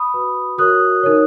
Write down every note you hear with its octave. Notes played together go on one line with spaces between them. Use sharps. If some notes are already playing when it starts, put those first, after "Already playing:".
Already playing: B5 D#6
F#4 B4
F#4 A#4 C#5 D#6 F#6
D#4 A#4 C#5